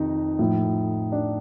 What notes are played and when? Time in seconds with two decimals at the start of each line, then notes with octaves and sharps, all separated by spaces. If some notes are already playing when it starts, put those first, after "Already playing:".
Already playing: F2 C3 D#3 D#4
0.39 A2 F3
1.12 D4